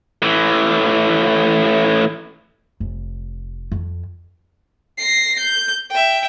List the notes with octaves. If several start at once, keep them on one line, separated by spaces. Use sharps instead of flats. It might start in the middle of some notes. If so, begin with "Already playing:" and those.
A2 E3
F1
F2
A#6 C7
G6
E5 G5